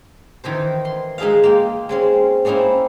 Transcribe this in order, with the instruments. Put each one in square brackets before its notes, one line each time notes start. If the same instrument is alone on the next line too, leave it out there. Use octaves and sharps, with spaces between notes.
[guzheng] D#3 E3 A#4 C5
C6
G#3 D#4 G#4 E5 F5
A#3 F4 G5
G#3 C4 C#4
A#3 C4 C#4 D#4 E4